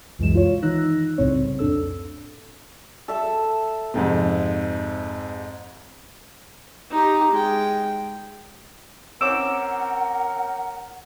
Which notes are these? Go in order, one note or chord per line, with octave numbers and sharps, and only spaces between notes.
C#2 F#2 B2 E3 G#3 E7
F4 C#5 E7
D#3 E3 D#4 E6 F#6 A#6
C2 A2 C#3 C4 C#5
F2 A2 D4 A4 E6
A4 E5
F2 G#2 C3
D#4 G4
G#3 G5
C4 C#4 A#4 F#5 D6 E6 D7 E7